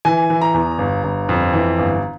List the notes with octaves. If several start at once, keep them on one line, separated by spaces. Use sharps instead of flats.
E3 G#5
E3
A#5
E2
G1
G1
F2
E3
G1